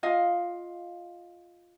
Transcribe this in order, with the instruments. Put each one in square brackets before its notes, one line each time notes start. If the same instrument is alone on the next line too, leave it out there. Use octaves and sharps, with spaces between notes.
[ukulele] F4 D#5 F5